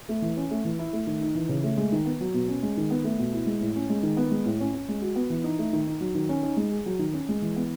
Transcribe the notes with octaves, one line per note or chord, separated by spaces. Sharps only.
A3
E3
C#4
A3
E3
E4
A3
D#3
D#4
E3
C#3
A3
G#3
D#3
B3
F#3
B2
C#4
G#3
D#3
B3
A3
B2
E4
G#3
A2
C#4
G#3
D#3
B3
G#3
A2
C#4
C#4
G#3
F#4
B3
E3
D#4
A3
D#3
D#4
F#3
D#3
C#4
D#4
G#3
G#4
F#3
D#3
C#4
G#3
E3
B3